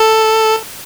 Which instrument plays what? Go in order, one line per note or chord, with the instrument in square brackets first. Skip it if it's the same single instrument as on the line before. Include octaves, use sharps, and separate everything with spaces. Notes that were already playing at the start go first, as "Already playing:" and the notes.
Already playing: [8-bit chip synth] A4